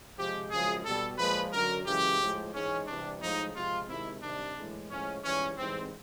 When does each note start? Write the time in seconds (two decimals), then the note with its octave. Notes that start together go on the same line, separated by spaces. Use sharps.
0.18 C3 F3 G#3 G4
0.51 F#2 C#3 F3 G#3 G#4
0.85 B2 G3 A4
1.18 A#2 F3 G#3 B4
1.53 F#2 D3 F#3 A#4
1.86 F#2 C#3 E3 G#3 G4
2.21 A2 F3 G#3
2.54 G#2 E3 G#3 C#4
2.87 C3 E3 G3 D4
3.22 A2 F3 G#3 D#4
3.55 C3 F3 G#3 F4
3.89 C3 D#3 G#3 E4
4.22 C3 D#3 G3 D4
4.56 A2 E3 G#3
4.90 A2 F3 G#3 C#4
5.24 G#2 E3 G3 C#4
5.58 G#2 E3 G3 C4